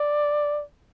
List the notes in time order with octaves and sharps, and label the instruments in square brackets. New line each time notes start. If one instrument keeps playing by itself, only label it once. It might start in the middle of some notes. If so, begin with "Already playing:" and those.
Already playing: [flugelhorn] D5